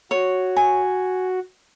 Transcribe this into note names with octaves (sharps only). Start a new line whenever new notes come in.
F#4 C#5
G#5